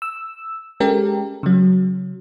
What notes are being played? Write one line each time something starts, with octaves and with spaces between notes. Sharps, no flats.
E6
G#3 C#4 G4 A4 A#4
C#3 F#3